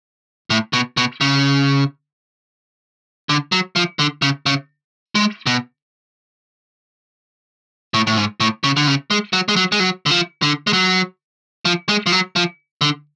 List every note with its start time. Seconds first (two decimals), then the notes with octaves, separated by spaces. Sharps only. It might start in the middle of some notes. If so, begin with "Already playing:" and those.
0.50 A2
0.73 B2
0.97 B2
1.21 C#3
3.29 D3
3.52 F#3
3.76 F3
3.99 D3
4.22 C#3
4.46 C#3
5.15 G#3
5.46 B2
7.94 A2
8.07 A2
8.17 G#2
8.40 A2
8.64 C#3
8.77 D3
8.87 C#3
9.10 G#3
9.33 F#3
9.48 G#3
9.56 F#3
9.72 G#3
9.80 F#3
10.06 D3
10.11 F3
10.42 D3
10.67 G#3
10.73 F#3
11.65 F3
11.89 G#3
12.06 F3
12.12 F#3
12.36 F3
12.81 D3